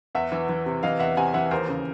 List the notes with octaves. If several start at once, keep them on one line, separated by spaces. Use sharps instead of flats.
E2 E5 F#5
E3
E3
C3
E3 D#5 F5
E2 E5 F#5
C3 F#5 G#5
E3 E5 F#5
D#2 A#4 C5
C#3